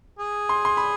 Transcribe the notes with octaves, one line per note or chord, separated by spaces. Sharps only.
G#4
C6
C6
B5